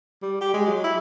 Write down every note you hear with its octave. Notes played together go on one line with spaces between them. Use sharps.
G3
G4
G#3
F#3
E4